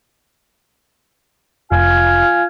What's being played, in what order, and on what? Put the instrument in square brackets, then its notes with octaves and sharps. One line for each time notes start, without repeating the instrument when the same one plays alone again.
[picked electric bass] F1 [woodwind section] F4 G#5 F6